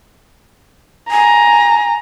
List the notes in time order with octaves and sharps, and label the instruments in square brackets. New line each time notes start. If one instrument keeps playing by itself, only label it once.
[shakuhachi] G#5 [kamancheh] A#5